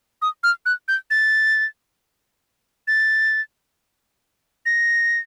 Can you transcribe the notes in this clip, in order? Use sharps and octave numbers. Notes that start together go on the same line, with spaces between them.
D#6
F6
F#6
G6
A6
A6
A#6